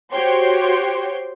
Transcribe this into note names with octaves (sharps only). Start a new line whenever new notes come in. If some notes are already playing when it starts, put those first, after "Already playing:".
F#4 G4 C5 C#5 G5 C6